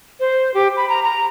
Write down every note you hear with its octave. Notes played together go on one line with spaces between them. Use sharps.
C5
G4
B5
A#5
A#5